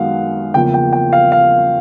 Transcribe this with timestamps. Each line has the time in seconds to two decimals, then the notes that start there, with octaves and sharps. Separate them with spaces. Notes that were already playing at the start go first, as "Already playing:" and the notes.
Already playing: F#2 D#3 G#3 B3 F5 F#5
0.54 E2 C#3 F3 A#3 G5
0.74 G5
0.93 G5
1.13 F5
1.32 F5